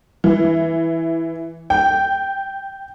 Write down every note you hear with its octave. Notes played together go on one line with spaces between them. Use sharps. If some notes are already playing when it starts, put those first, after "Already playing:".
E3
G5